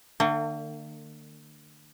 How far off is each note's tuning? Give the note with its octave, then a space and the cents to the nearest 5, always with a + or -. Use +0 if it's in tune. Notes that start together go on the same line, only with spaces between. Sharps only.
D3 +35 A#3 -45 F#5 +25